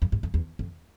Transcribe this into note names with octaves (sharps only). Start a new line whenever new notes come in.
F2
G#2
F2
E2
F2